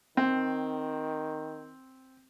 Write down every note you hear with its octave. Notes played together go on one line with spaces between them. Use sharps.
D#3 C4